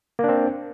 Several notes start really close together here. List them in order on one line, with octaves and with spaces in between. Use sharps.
A#3 D4 C4